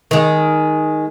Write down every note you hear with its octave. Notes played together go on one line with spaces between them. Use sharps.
D#3 G#3